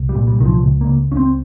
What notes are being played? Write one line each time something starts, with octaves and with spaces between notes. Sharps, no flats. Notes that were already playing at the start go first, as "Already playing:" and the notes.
Already playing: C2
G3
A#2
G3
C2 D#3
F3
C#2
A#3
C#3
C#2 C#4
C4